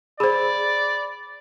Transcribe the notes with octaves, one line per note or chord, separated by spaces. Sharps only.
G#4 C5 D5 B5